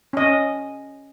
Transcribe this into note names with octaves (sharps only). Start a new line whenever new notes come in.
C#4 D#5